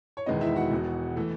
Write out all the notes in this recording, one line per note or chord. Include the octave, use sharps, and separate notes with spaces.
C#5
E1 E2 D#3 G#3 B3 D#5
E4 E5
F#4 F#5
E1 E2 B2
E3 A3